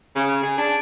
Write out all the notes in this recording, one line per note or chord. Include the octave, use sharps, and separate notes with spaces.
C#3
G#4
D4